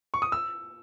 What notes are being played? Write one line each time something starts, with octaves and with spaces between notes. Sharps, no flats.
C#6
D#6
E6